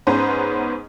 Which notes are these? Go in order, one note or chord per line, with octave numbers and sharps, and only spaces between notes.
G#2 B3 C#4 B4 C5 A#5